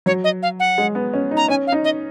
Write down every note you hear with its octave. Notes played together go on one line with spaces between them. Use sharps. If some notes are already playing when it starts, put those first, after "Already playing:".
F#3 C#5
D#5
F5
F#5
G#3
B3
C#4
D#4
A#5
C#4 G#5
F5
D#4
D#5